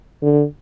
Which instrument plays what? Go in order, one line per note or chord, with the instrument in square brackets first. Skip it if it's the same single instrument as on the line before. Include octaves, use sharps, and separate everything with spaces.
[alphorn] D3